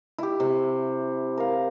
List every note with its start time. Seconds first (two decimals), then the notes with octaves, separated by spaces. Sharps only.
0.18 E4 G4
0.40 C3
1.38 A#4 F5